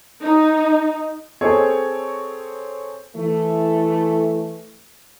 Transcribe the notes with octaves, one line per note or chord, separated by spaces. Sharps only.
D#4
C4 G#4 A4 C#5
E3 A3